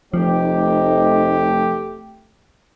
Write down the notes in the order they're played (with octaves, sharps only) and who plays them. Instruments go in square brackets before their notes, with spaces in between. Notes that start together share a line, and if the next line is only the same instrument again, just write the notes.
[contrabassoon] F1 [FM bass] F3 [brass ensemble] A3 G4 [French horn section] D#4 C5